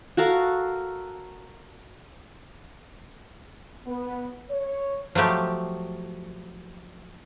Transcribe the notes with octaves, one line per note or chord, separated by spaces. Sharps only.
F#4 A4 A#4 F5
B3
C#5
F3 F#3 A3 G4